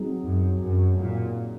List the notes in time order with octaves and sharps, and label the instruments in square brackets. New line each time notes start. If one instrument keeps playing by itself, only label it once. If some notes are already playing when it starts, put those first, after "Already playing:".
Already playing: [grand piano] F#3 C4 D#4 G#4
[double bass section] F#2
F#2
A#2